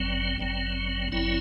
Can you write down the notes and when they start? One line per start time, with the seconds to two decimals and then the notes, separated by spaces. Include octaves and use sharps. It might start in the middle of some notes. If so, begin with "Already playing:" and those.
Already playing: G1 F#2 F#3 C4
0.40 G1 F#2 F#3 C4
1.12 G1 F#2 F#3 C4 E4